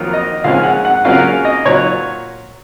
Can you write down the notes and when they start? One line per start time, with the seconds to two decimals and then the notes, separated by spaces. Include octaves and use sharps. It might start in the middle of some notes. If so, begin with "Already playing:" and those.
Already playing: F2 D#3 F#3 A#3 F4
0.13 D#5
0.44 A#2 F3 G#3 C#4 F5
0.63 F#5
0.85 F#5
1.05 C#3 F#3 A#3 C#4 F4 F5
1.45 D#5
1.65 A#2 F#3 C#5